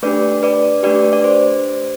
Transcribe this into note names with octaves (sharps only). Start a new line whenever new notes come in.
A3 D4 G4 B4 D5
B4 D5
A3 D4 G4 B4 D5
D5
C5